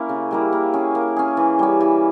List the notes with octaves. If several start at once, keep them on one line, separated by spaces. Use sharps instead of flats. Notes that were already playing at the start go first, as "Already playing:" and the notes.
Already playing: A#3 C#4 E4
C#3
G3 A#3 E4
A#3
C#4 G#4
A#3
C#4 G#4
E3
G3 C#4
E3